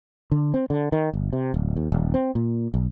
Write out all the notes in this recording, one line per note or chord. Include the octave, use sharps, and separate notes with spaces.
D3
C4
D3
D#3
G1
C3
D1
D#2
D#1
C4
A#2
B1